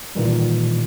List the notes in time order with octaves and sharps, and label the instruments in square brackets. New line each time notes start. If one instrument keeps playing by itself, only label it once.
[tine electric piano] A#2 D#3 E3 G3